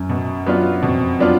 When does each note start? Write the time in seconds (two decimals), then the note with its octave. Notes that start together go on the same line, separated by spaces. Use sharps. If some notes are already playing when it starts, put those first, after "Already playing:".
Already playing: F#2
0.09 B2
0.46 F#3 B3 D4 F4
0.82 F2 B2
1.19 F#3 B3 D4 F4